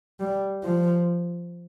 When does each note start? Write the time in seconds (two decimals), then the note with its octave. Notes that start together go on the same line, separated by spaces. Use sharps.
0.20 G3
0.63 F3